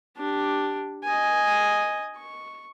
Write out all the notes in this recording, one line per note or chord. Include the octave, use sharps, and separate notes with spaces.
D4 G4
D#5 G#5
C#6